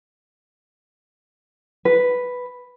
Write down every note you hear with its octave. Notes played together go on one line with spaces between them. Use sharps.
B4